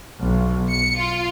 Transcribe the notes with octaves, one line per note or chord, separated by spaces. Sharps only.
B1
C#7
F4